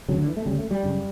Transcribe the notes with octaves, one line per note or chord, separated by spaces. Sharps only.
D2 C#3 F#3
D3
E3
A3
D2 C#3 G3
A3
G3
F#2 C#3